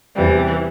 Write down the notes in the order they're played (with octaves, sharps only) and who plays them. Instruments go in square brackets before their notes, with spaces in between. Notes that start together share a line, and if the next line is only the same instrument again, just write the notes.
[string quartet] E2 C3 G3 [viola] E3